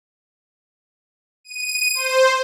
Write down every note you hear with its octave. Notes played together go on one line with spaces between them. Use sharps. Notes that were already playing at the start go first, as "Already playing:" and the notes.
D#7
C5